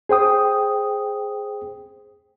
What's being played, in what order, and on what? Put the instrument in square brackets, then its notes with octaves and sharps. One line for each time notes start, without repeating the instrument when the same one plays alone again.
[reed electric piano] G#4 C5 G5 D#6